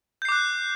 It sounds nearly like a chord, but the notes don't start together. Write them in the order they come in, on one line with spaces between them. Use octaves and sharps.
G6 C7 D6 F#6